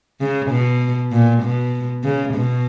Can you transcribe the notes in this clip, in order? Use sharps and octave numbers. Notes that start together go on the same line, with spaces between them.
C#3
B2
A#2
B2
C#3
B2